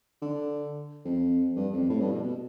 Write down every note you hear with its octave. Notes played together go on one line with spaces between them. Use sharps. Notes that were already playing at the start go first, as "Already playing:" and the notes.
D3
F2
G2
F2
A2
G2
B2
B2